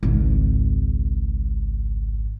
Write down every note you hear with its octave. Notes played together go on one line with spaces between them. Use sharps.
G#1 C#2